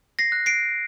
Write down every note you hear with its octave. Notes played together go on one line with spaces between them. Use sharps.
A#6 C7
F#6
C7 D7